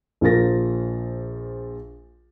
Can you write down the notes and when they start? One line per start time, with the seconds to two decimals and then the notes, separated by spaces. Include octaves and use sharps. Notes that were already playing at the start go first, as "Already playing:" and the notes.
0.21 A#1 F3 F4 A#4 A6 A#6